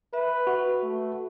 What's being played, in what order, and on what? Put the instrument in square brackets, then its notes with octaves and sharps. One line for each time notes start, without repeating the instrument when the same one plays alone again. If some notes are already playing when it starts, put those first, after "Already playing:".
[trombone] B4 [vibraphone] E5
[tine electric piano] F#4
[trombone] A3